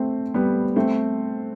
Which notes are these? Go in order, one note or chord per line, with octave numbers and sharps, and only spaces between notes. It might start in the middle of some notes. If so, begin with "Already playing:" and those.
Already playing: A3 C4
G3 B3
A3 C4